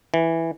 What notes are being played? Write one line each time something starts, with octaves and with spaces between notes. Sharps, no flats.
E3